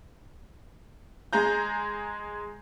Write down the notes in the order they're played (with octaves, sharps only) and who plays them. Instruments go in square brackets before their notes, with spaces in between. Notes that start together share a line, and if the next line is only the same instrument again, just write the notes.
[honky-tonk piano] G#3 G#4 A#5 G6